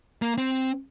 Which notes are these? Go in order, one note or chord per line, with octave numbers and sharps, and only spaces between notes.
A#3
C4